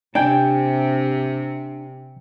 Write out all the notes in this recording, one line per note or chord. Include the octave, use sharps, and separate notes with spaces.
C3 D4 G5 G#5